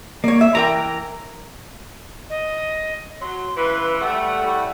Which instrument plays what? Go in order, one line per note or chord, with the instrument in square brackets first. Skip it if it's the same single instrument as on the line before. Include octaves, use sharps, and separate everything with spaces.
[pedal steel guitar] A#3 [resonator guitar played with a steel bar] C#5 D5
[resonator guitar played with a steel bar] E5
[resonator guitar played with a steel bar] E3 A#4 G5 [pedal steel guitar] A#5
[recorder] D#5
[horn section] F#3 [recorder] C6
[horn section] C#3 E3 B4 [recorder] C6
[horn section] G3 A3 [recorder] F#5
[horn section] A2 G3 A3